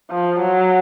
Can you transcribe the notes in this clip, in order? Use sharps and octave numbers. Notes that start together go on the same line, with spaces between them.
F3
F#3